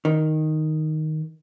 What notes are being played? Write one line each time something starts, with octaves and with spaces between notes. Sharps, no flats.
D#3